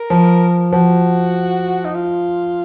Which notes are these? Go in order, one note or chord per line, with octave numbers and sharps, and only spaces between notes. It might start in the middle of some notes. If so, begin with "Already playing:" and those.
Already playing: A#4
F3
F3 F#4
D#4
F4